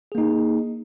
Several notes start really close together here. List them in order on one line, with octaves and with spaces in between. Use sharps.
G#4 A#3 D#4